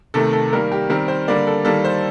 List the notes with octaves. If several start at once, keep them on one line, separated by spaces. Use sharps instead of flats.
C3 D#3 A3 A4
A4
D#3 G3 A#3 A#4
G4
D#3 G3 C4 A#4
C5
D3 G3 A#3 D5
A4
D#3 G3 A#3 A4
C5